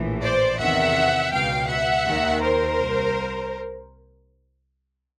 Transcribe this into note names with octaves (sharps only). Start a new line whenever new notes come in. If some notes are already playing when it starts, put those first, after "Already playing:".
Already playing: A#1 A2 E3
C5 D5
E2 C3 D#3 E5 F#5
C#2 B2 F5 G5
E5 F#5
D#2 D#3
A#4 C5
C2